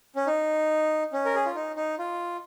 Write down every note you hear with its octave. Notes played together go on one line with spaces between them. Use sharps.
C#4
D#4
C#4
A#4
G#4
F4
D#4
D#4
F4